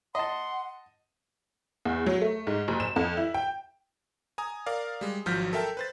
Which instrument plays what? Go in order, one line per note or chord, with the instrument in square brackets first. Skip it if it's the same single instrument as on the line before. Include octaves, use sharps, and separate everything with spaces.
[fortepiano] D#5 A5 [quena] F#5 [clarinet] C6
[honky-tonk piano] E2
F#3
A3
G#2
F#1
E7
F2
E4
G5
[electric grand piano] G#5 A#5 D#6
A#4 D5 F5
G3 G#3
G#1 F3 F#3 F6 G6 B6
A4 A#4 E5 G5 A5
B4 C5 A6